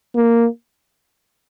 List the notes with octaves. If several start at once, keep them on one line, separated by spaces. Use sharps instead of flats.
A#3